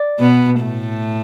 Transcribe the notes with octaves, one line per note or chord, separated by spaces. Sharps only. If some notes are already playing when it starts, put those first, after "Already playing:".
Already playing: D5
B2 B3
A2 A3